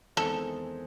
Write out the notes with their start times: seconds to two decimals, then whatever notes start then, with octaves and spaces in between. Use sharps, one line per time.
0.16 E2 D#3 G#3 C4 D#4 A4